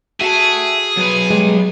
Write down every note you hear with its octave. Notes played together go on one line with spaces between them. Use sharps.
F#4 G#4 E5 F#5 A5
F#3 B4
G3 G#3